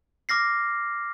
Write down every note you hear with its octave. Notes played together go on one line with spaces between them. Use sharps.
D6 F6 A#6 C7